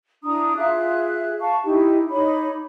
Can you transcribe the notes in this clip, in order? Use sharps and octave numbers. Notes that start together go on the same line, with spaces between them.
D4 E4 A#5 D#6
F4 G#4 E5 F#6
F5 A5 C#6
D#4 E4 G4
D#4 C#5 B5 D6